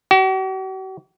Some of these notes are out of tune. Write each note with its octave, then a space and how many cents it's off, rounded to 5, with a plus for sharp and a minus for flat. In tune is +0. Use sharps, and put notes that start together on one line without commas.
F#4 +45